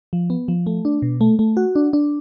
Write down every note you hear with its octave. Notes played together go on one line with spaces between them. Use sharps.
F3
B3
F3
A3
D4
B2
A3
A3
F#4
D4
D4